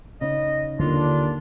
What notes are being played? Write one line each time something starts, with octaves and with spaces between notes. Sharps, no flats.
C#3 D#4 D#5
D#2 D3 D4 F4